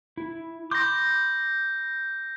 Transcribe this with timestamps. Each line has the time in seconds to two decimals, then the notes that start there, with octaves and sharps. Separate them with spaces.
0.17 E4
0.71 B5 C6 D6 G6 A#6